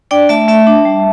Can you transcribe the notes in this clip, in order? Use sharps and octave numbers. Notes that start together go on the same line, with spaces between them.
D4 D5 G5
A3 E5 A5
A3 E5 A5
D4
G3